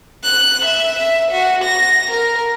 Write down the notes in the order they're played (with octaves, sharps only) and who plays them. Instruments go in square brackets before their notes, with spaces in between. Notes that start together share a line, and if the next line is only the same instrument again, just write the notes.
[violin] F#6
E5
E5
F#4
A#6
A#4